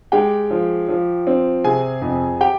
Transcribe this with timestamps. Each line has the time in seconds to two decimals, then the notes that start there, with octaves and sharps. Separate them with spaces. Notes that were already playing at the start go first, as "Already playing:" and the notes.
0.12 G#3 G4 G5
0.50 F3
0.89 F3
1.27 C4
1.64 C3 G#4 G#5
2.02 F2
2.41 G4 G5